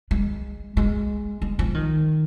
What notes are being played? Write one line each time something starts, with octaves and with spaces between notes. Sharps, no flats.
G#3
G#3
G#3
F3
D#3